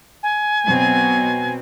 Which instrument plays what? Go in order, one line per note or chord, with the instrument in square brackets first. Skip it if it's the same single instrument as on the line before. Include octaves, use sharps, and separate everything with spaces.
[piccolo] G#5
[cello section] B2 F#3 C4